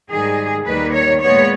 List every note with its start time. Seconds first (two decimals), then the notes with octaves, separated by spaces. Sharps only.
0.10 G#2 D#3 G3 G#4
0.66 D#2 D#3 G3 A#3 B4
0.93 C#5
1.21 A#2 G#3 B3 C#5